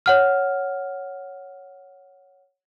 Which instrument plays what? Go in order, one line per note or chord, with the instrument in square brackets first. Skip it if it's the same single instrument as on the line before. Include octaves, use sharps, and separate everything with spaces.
[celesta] C#5 F#5 F6